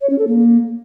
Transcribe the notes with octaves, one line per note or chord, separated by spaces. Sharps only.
C#5
C#4
A4
A#3